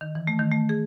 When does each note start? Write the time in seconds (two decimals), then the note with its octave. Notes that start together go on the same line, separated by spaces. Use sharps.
0.01 D#3
0.15 E3
0.27 A3
0.39 D#3
0.52 A3
0.69 G#4